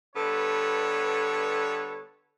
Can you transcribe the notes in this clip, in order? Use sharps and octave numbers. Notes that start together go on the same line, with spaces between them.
D3 G3 B3 A4 B4 C#5